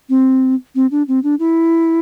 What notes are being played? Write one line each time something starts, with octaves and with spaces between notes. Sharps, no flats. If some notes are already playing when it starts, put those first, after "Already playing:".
C4
C4
D4
C4
D4
E4